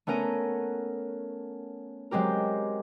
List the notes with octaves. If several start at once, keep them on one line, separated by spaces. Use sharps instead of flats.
A3 B3 C#4 A#4 D#7
F#3 G#3 C4 G4 A#4